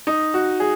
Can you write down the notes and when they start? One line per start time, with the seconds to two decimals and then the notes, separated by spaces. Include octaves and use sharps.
0.07 D#4
0.34 F#4
0.60 G#4